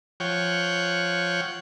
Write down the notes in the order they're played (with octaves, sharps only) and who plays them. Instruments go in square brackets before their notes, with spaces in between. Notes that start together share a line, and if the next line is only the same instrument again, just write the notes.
[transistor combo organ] F3 C#5 F#5 G5